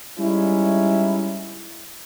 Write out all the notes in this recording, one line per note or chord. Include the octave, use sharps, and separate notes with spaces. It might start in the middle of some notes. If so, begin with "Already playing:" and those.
G3 G#3 C#4 D#4 E4